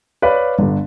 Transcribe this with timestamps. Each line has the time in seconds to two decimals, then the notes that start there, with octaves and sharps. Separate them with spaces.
0.22 B4 C#5 D5 F5 B5
0.59 G1 D3